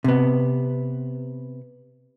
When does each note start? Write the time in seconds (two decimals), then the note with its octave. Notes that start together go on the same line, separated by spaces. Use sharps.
0.04 C3 B3